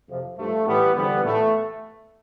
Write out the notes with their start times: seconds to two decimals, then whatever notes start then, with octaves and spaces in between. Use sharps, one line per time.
0.09 F2 C3 F3
0.37 G2 F3 A3
0.66 A2 E3 G3 B3
0.94 E2 D3 F3 G3 B3
1.23 A2 E3 A3